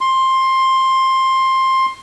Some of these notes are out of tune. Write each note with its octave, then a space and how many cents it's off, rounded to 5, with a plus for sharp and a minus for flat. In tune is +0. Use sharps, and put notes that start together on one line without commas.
C6 +15